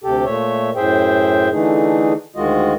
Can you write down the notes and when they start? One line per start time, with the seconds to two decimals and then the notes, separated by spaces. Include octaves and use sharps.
0.04 D2 C3 G4 A4
0.25 A#2 A3 C#5 E5
0.76 F#2 A2 G#4 C5 E5 G5
1.52 D3 E3 A3 D#4 G#4
2.36 D2 D#3 G#3 F4 F#4 D#5